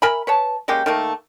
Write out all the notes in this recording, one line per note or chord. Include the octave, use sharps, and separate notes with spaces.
A#4 E5 G#5 B5
B4 C#5 A5
G#3 A#3 C#4 G4
D#3 A3 A#3